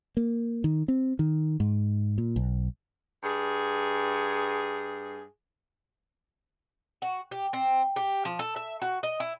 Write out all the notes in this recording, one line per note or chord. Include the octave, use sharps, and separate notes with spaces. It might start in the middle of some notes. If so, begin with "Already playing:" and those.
A#3
D#3
C4
D#3
G#2
A#2
B1
G2 G#4
F#4
G4
C4
G4
F3
A4
E5
F#4
D#5
E4